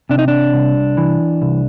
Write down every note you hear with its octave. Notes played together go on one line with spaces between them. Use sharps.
C3 D4
D#4
D4
C2
E3
C2